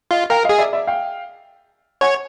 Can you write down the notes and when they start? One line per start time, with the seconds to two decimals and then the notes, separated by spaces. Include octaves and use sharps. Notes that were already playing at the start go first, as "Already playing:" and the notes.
0.11 F4 D#5 F5
0.30 A#4 F5 G5
0.44 D#5 F5
0.49 G#4
0.58 D5 E5
0.73 D5 E5
0.87 F5 G5
2.01 C#5 F#5 G#5